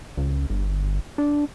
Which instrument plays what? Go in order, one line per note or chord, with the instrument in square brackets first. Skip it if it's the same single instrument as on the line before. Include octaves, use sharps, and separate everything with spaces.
[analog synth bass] C#2
G1
D4